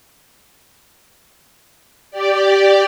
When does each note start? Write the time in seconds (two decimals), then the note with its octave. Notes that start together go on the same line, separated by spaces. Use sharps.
2.11 G4 D5